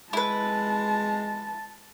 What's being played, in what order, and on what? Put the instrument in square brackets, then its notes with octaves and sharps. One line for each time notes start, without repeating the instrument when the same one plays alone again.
[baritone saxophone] G#3 [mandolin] E4 B4 [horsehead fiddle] A5